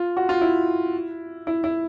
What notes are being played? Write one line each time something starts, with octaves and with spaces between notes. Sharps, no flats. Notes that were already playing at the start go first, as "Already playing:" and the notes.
Already playing: F4
F#4
F4
E4
E4
E4